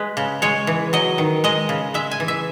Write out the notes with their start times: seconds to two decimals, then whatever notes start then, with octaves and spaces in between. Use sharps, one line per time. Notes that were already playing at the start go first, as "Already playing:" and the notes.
Already playing: G#3 B4
0.17 C#3
0.42 G#3 C#5
0.67 E3
0.93 F#3 D#5
1.18 D#3
1.44 G#3 D#5
1.69 C#3
1.94 G#3 E5
2.11 G#5
2.20 E3
2.28 E5